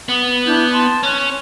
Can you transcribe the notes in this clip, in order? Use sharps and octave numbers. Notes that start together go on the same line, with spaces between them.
B3
D4 E4 G6
A5 C6
C#4 F#6